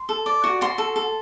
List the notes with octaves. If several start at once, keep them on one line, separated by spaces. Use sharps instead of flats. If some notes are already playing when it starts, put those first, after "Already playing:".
Already playing: C6
A4
D5
F#4
F#4 C6
A4
A4